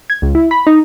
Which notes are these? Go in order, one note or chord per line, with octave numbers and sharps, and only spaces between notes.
G#6
C#2
E4
B5
D#4